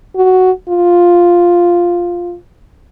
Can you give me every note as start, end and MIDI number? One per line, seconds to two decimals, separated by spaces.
0.16 0.51 66
0.69 2.35 65